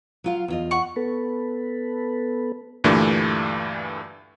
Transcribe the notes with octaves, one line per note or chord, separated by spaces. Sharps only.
F#3 F4 F5
E2 F4 D#5
F#5 C#6
B3 A4 B4
D2 G2 A#2 E3 G3 A3